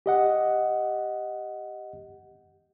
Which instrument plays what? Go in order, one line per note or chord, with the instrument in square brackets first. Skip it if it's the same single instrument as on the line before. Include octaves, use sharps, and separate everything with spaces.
[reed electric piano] G4 D#5 F#5